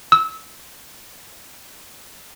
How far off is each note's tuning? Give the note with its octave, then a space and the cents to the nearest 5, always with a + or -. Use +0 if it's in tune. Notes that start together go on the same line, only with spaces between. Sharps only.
E6 -25